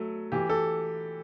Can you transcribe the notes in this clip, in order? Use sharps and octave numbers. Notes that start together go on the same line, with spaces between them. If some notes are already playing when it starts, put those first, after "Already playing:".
Already playing: F#3 A3
E3 G4
A4